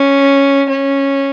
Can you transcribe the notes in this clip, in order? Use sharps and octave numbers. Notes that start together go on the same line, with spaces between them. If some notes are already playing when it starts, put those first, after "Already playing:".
Already playing: C#4
C#4